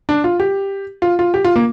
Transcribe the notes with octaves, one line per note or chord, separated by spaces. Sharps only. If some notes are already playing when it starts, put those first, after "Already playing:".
D4
F4
G4
F4
F4
G4
F4
A#3